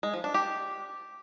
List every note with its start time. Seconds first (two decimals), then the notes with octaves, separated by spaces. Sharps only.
0.03 G#3
0.14 F3
0.24 D4
0.34 G4